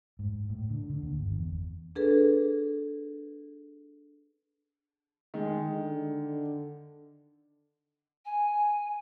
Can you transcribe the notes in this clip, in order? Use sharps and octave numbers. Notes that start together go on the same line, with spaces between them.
G#2
A2
D3
D3
D#2
G1
E2
D4 G#4 A4 B4
D#3 G#3
D3
G#5